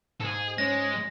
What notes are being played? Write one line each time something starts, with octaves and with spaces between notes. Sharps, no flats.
G#2 G#4 A4
G#3 C#4 A#6